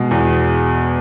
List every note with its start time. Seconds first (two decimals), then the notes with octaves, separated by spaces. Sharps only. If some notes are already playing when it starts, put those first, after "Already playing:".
Already playing: B2 G#3
0.11 E2